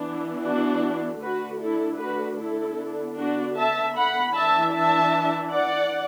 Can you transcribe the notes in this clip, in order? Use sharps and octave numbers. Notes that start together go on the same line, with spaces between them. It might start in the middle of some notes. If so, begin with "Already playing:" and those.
Already playing: E3 B3 D4
D4 F#4
D3 A3 D4 F#4 B4
E4 A4
F#4 B4
E4 A4
D3 B3 D4
D4 F#4
E5 A5
F#5 B5
E3 D4 E5 A5
E5 A5
D5 F#5